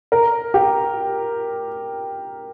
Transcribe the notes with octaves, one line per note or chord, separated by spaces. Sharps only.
A#4
G4